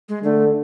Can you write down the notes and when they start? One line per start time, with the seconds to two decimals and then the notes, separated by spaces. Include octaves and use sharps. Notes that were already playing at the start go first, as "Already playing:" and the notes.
0.09 G#3
0.24 D3 A3